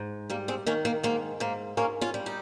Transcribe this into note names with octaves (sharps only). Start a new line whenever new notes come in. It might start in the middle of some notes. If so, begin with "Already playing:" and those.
Already playing: G#2
G3 A#3
G#3 C4
D#3 A#3 C#4
A#3
G#2 A#3
G#2 A#3
G#2 A#3 C#4
C#4 F4
G3
D#4 G4